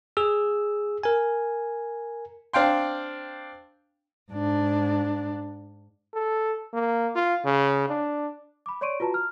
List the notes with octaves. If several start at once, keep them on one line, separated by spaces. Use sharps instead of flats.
G#4 E6
A#4 G#5
C4 D4 F5 G5 C6
G#2 D4
A4
A#3
F4
C#3
D4
B5 D6
C#5 D5 C6 C#6 D7 D#7
F4 F#4 B4 A5 A#5
F6